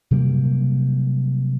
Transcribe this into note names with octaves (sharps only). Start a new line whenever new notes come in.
C3 F#3 G3 A#3